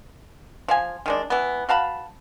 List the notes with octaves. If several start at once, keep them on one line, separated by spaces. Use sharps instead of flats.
F3 F5 G#5
D#3 G#3 D4
E3 B3
F#4 F5 A5 B5